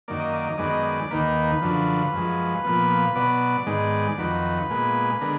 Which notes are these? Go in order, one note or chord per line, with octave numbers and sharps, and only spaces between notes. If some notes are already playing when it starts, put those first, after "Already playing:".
F#2 D#3 A#3 D5
D#5
D5
D#5
F#2 D#3 G#3 B3 D5
D#5
D5
D#2 D#3 A#3 B4
F#2 D3 F3
F#2 F3 G#3
A#2 F3 B3
B2 F#3 B3 D5
G#2 D#3 G#3 B3
F2 D#3 F#3 B4
A#2 G#3 B3
D3 G#3 B3 A#4